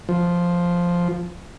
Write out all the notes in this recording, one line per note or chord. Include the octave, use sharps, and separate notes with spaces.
F3